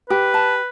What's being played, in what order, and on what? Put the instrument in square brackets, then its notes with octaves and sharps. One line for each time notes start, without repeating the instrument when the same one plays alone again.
[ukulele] G4 [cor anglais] B4
[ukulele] A5